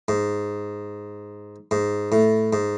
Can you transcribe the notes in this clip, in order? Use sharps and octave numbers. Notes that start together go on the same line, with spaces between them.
G#2
G#2
A2
G#2